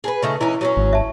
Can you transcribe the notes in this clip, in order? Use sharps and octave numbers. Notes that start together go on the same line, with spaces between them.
G#4 A#4 B4
C#3 A3 D#4
E3 C#4 D#4 E4
F#3 C4 C#4
G#1
E5 A5